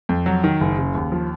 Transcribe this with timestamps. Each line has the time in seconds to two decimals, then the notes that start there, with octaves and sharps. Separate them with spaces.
0.09 F2
0.26 F#3
0.44 D#3
0.61 F#1
0.78 C#3
0.95 D#2
1.12 F3